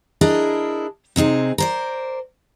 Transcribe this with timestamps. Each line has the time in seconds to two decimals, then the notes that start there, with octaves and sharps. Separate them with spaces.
0.21 D4 E4 G#4 A#4 D#5
1.16 C3 C4 D#4 G#4
1.58 A#4 C5 D5